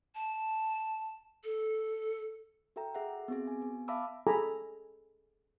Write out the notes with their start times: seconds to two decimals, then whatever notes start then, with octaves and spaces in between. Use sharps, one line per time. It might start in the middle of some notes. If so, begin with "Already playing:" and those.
0.15 A5
1.44 A4
2.76 F#4 A4 E5 G5 A#5
2.95 G#4 E5 F#5
3.28 B3 C4 F#4 G#4
3.47 G#5
3.62 B3
3.88 E5 F5 A5 B5 D6 E6
4.27 G#4 A4 G#5 A#5 B5 D6